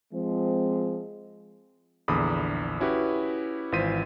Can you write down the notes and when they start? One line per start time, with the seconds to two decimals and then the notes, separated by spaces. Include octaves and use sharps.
0.13 F3 G#3 C4
2.08 A#1 E2 D3 B5 D6 D#6
2.80 C#4 E4 F#4 G4 B4
3.72 G#1 E3 F4 C5 B6 D#7